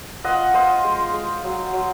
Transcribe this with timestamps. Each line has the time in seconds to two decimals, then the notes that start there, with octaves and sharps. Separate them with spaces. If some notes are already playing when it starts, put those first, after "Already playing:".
0.24 F4 D#5 F#5
0.54 F4 C5 D#5
0.84 G#3
1.13 G#3
1.44 F#3
1.73 F#3